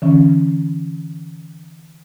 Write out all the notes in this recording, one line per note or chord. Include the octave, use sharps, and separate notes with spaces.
D3 E3 C#4